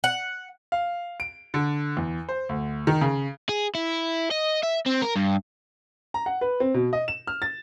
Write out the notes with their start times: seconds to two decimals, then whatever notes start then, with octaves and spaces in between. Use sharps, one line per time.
0.04 F#5
0.72 F5
1.20 D7
1.54 D3
1.97 E2
2.29 C5
2.49 D2
2.87 D#3
3.01 C#3
3.49 G#4
3.75 E4
4.31 D#5
4.63 E5
4.86 C4
5.02 A#4
5.16 G2
6.14 A#5
6.26 F#5
6.41 B4
6.60 C4
6.74 B2
6.93 D#5
7.08 E7
7.27 F6
7.42 A6